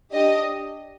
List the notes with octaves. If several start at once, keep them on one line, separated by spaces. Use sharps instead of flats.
D4 G4 D#5